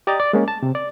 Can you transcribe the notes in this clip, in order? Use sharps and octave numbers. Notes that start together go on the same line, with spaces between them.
G4 D5 D#5 A#5 D#6 A6
D5
G#3 A#3 C#4
A5
C3
D5